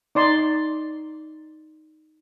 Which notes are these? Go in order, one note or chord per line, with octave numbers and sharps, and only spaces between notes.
D#4 D5 C6